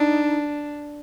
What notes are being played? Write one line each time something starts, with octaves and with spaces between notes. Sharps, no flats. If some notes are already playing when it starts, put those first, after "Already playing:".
Already playing: D4 D#4